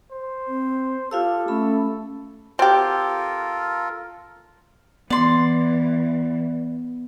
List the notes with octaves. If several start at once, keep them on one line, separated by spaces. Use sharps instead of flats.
C5
C4
F4 G4 A4 F5 E6
A3 C#4 B5
C4 F4 G4 A4 A#4
E3 B3 D5 C6